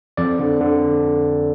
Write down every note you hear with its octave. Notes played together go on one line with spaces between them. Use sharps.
F2 D5
D3
D3